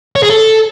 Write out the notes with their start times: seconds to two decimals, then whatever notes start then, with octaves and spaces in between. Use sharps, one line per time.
0.16 C#5
0.23 G#4
0.30 A4